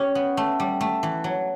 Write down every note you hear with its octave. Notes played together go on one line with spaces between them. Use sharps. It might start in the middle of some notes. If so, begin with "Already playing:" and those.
Already playing: C#4 G4
B3
A3
G3
A3
E3
F#3